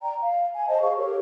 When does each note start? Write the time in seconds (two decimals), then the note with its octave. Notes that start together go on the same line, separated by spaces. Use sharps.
0.01 D5 G5 A#5
0.21 F5
0.53 G#5
0.68 C5 D#5 A5
0.81 G#4 F5 C#6
0.97 G4 A4 A#4 C#5